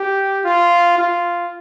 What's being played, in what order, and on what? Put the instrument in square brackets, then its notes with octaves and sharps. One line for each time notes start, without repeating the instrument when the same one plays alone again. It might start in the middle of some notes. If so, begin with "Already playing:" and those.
Already playing: [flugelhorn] G4
F4
F4